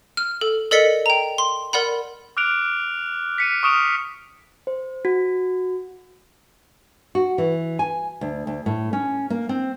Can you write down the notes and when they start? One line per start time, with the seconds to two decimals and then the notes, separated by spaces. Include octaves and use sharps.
0.17 F6
0.41 A4
0.71 A4 A#4 D5 D#5 B6 C#7
1.06 G5 A#5
1.38 C6
1.73 A#4 D5 F#5 B5
2.37 D6 F6 F#6 D7 F7
3.38 B6 C#7 D#7
3.63 C#6 D#6 F6 D7 E7 F7
4.67 C5
5.05 F#4
7.15 F#4
7.38 E3
7.79 G#5
8.21 D2
8.47 D2
8.66 A2
8.93 C#4
9.30 A#3
9.49 C4